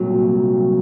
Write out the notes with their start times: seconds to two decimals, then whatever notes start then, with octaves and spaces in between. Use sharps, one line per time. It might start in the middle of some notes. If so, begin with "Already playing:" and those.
Already playing: C2 A#2 F#3